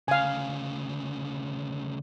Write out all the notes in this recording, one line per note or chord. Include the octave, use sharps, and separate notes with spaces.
D2 C#3 F5 G#5